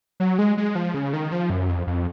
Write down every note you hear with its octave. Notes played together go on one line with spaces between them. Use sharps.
F#3
G#3
G#3
F3
C#3
D#3
F3
F#2
F2
F2